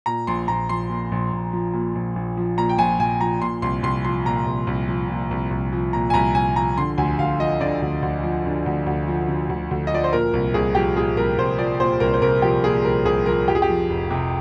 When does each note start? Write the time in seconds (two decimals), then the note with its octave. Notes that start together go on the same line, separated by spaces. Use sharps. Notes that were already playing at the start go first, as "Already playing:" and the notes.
0.06 A#2 A#5
0.27 A#1 C6
0.48 A#1 A#5
0.69 F3 C6
0.90 A#2
1.12 A#1
1.33 A#1
1.53 F3
1.73 A#2
1.95 A#1
2.16 A#1
2.37 F3
2.58 A#2 A#5
2.69 G5
2.78 A#1 G#5
2.99 A#1 G#5
3.21 F3 A#5
3.41 A#2 C6
3.62 C2 C6
3.83 C2 C6
4.05 F3 C6
4.25 A#2 A#5
4.46 C2
4.67 C2
4.88 F3
5.09 A#2
5.31 C2
5.51 C2
5.72 F3
5.93 A#2 A#5
6.10 G#5
6.14 C2 A#5
6.34 C2 G#5
6.56 F3 A#5
6.77 D3 C6
6.98 D2 G#5
7.19 D2 F5
7.39 F3 D#5
7.60 D3 D5
7.82 D2
8.02 D2
8.23 F3
8.45 D3
8.66 D2
8.86 D2
9.08 F3
9.28 D3
9.49 D2
9.71 D2
9.87 D#5
9.92 F3 D5
10.04 C5
10.13 A#2 A#4
10.33 C2
10.54 C2 G#4
10.75 F3 G4
10.96 A#2 G#4
11.17 C2 A#4
11.38 C2 C5
11.58 F3 D5
11.80 A#2 C5
12.00 C2 A#4
12.13 C5
12.22 C2 A#4
12.42 F3 G4
12.64 A#2 G#4
12.84 C2 A#4
13.05 C2 G#4
13.26 F3 A#4
13.48 F2 G4
13.55 G#4
13.62 G4
13.69 F3
13.89 F1
14.10 C3